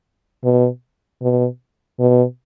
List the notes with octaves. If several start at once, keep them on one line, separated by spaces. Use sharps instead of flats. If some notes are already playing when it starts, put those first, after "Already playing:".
B2
B2
B2